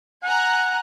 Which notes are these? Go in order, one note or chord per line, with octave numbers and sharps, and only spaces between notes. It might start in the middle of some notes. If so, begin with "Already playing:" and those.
F#5 G#5 A#5 F#6